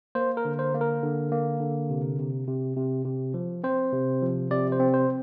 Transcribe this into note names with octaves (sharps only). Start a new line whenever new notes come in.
A#3 C5
A#4
D3
C5
A#3
A#4
D3
A#3
D3
C3
C3
C3
C3
C3
F3
C4 C5
C3
F3
C3 D5
C5
C4
C5